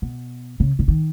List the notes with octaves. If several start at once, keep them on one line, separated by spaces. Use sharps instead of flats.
B2
C#3
C#3
D#3